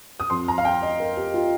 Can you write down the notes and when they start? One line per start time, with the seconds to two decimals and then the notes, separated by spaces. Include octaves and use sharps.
0.20 D#6
0.30 F2 F3 C6
0.48 A#5
0.58 F5
0.65 G5
0.82 D#5
1.00 A#4
1.17 G4
1.34 F4